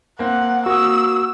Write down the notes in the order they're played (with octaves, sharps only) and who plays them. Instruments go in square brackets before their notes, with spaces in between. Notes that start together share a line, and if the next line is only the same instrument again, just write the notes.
[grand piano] A#3 C4 [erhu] F#5
[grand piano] A#3 D#6 [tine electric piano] F#4 [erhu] E6